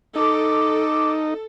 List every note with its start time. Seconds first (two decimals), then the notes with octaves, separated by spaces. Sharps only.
0.15 D#4 A4 D6